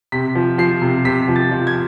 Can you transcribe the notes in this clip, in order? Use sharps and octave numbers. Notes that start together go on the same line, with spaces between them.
C3 B6
F3
F3 C7
C3
C3 B6
F3
A6
F3
G#6